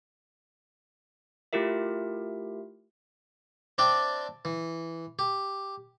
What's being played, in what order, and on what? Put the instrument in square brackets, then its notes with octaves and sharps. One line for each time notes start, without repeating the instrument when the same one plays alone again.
[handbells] A3 E4 F4 G4 A#4 E5
[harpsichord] C4 D4 D5 E5 G5
E3
G4